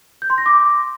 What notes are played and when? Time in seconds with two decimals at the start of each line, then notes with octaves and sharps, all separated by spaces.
0.22 G6
0.30 C6
0.38 A#6
0.46 D6